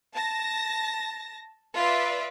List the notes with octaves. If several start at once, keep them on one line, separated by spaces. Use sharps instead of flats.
A5 A#6
F4 B4 D5 E5